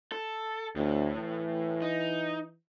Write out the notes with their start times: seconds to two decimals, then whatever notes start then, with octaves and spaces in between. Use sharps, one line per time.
0.12 A4
0.76 D2 A2
1.19 E3
1.82 D#4